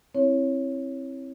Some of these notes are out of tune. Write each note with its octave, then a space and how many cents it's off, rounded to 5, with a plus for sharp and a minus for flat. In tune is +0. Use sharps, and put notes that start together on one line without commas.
C4 +25 E4 +0 C#5 +0